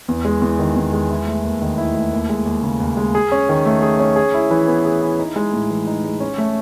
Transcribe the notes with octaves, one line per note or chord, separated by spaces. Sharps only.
E2
G#3
E2
D#3
E2
G#3
E4
A3
D#2
D#3
E4
A3
D#2
G#3
D#2
C#3
D#2
G#3
G#4
C#4
D#3
A3
G#4
C#4
G#4
E4
E3
B3
G#4
E4
D#4
G#3
A2
E3
D#4
G#3
C#4
A3